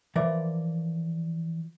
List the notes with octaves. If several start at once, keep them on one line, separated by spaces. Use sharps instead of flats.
E3 F3 A#4 D5